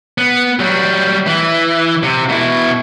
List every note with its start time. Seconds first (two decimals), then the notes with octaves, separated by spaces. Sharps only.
0.18 B3
0.59 F#3 G3
1.27 E3
2.03 C3
2.29 B2 E4